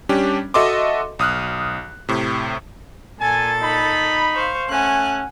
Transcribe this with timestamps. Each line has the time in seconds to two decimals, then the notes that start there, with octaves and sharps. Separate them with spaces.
0.09 G3 C#4 D4 G4
0.54 F#4 A4 D#5 E5 C6 D6
1.19 B1 D#6 F6 F#6
2.09 A2 C3
3.19 A#2 A4 G#5 A6
3.62 D#4 B5
4.34 C5 F5 C#6
4.69 A3 C#4 F#5 G#5 F#6